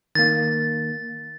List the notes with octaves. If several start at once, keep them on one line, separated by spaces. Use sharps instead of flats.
D#3 A#3 A6